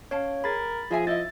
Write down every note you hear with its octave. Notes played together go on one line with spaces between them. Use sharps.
C#4 C#5 F5 A5
G#4 A#4 B5 A6
F3 G#4 D#5 E5 G#5
E4 D#5 E5 A6